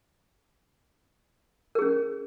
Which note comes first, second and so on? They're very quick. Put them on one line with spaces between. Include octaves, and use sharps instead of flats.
A#4 G#4 C#4